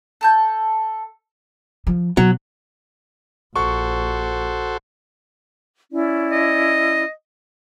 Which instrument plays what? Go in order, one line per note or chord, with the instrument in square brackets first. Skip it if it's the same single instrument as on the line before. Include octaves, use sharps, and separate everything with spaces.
[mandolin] A4 A5 G6
[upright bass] F3
[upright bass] B2 [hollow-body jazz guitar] F#3
[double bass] A#1 [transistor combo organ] F#4 A4 C5 [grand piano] C#6
[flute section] C#4 E4 D5
[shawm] D#5